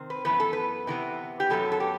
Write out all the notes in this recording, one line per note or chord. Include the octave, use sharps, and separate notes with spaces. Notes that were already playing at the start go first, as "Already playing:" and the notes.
Already playing: C3 D#3 C4
B4
F#2 E3 B3 B4
A4
B4
C3 E3 B3
G4
F#2 F#3 B3 A4
A4
G4